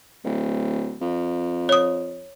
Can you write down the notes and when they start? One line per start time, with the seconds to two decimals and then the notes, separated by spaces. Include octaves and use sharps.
0.24 D1
1.01 F2
1.69 C#5 D#6